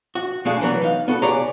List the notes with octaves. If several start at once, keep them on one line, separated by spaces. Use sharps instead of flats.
F#4
B2 A3 D4 G#4 F5 G#5
E3 F#3 B3 A#4
D#4 F5
B3 F#4 A4
C#2 G4 G#4 C#5 D5 A#5